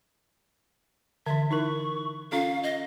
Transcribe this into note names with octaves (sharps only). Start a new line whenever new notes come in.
D3 E3 E5
D#4 E4 A#4 C#6
C#4 F4 A4 F5
D#5